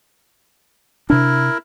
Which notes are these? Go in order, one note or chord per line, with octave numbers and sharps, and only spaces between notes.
C3 D4 E4 A#4